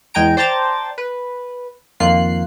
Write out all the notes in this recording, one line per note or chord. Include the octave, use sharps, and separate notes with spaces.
E2 G#3 G5 G#5 A#5 D7
C5 D5 G5 A5 A#5 A6
B4
F2 D#3 A#3 F4 F#6 C7